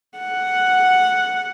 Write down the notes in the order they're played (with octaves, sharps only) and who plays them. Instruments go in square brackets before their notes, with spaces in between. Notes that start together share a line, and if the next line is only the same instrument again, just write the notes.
[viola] F#5